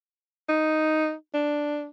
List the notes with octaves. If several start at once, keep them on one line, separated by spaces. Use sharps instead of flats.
D#4
D4